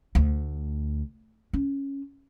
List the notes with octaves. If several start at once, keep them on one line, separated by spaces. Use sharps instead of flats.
D2
C#4